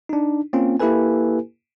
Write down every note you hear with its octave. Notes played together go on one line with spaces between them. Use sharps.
D4 D#4
A#3 C4 C#4 F4
A#3 E4 G4 A4 B4 G#5